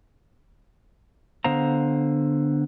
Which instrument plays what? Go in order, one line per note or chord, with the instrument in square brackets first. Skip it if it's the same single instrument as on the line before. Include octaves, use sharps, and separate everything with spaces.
[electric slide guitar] D3 B3 C5 F5 A#5